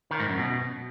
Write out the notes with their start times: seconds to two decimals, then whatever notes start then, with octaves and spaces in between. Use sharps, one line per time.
0.11 D#3
0.20 G#2
0.29 F#2
0.38 B2